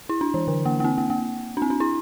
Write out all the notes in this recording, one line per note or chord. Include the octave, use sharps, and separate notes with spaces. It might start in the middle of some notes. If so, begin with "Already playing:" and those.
E4
D4
E3
D3
A#3
A#3
C4
A#3
A#3
D4
C4
D4
E4